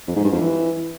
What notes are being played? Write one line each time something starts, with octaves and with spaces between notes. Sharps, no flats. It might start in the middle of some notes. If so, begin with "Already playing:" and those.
F2
G#2
G2
F2
E3